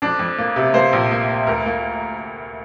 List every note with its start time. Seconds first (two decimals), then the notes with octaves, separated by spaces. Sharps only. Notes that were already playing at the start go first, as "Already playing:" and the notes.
0.02 F2 D4
0.19 F2
0.38 A#3
0.56 C3
0.74 A#3 C5
0.93 A#1
1.11 A#3
1.29 A#3
1.47 D2 A#4
1.66 A#3